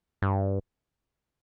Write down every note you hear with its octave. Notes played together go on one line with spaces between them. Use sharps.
G2